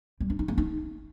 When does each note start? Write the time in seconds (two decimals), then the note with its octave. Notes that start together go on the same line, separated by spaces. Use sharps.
0.20 G3
0.30 D4
0.39 D#4
0.48 A#3
0.58 D#4